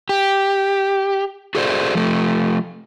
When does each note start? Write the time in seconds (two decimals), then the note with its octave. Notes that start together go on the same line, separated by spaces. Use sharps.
0.09 G4
1.55 F#4 G#4 A4 C5 D5
1.95 F3 A3